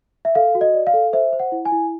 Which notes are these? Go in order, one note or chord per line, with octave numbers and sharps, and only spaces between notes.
E5
A4 F5
F#4
D#5
D5
F5
A4
C5 E5
C5
F#5
E4
G#5
E4